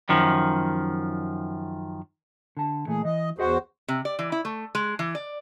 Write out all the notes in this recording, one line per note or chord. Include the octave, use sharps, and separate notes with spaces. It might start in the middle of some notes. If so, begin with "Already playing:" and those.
F#2 D#3 F3
D3 A5
A#2 E3 A3 G#4
E3 D#5
E2 F#4 G#4 C5 D#5 F#5
C3
D5
E3
E4
A3
G#3
E3
D5